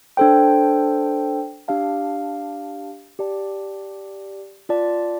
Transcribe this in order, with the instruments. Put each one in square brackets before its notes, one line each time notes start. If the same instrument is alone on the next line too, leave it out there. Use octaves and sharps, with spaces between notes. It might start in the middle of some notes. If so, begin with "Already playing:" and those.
[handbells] D4 A4 C5 G5
D4 G4 F5 A5
G4 D5 A5
F4 D5 A5